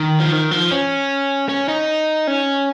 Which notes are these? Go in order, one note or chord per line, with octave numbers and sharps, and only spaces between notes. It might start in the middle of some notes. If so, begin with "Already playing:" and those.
Already playing: D#3
F3
D#3
F3
C#4
C#4
D#4
C#4